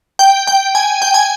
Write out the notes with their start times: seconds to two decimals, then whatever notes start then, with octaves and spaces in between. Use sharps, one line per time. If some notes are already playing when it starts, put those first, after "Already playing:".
0.19 G5
0.47 G5
0.75 G#5
1.02 G5
1.14 G#5